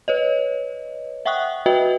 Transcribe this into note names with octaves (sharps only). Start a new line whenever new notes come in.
B4 C#5 D#5
E5 F#5 G5 C#6 D#6 F#6
F#4 B4 D#5 E5 G5